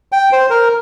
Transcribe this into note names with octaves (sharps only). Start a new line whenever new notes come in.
G5
C5
A#4